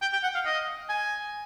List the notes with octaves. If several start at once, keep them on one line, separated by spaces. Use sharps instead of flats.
G5
G5
F#5
F5
D#5
G#5